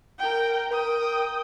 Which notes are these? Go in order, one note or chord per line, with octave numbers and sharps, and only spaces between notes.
A#4 G5
A#4 G5 D#6